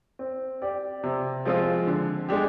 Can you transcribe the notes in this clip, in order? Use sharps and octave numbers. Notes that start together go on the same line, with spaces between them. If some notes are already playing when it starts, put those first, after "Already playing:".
C4
G4 D5
C3
F3 G#3 C4 F4
D3
G#3 D4 G4